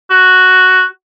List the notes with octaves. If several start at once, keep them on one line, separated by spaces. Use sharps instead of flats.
F#4